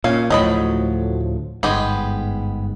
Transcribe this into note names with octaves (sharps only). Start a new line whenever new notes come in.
A#2 C#4 F5
D2 A2 F3 F#3 D#5 B5
G1 G#2 G#3 B3 G4